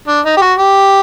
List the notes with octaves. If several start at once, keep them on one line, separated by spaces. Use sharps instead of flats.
D4
D#4
G4
F#4
G4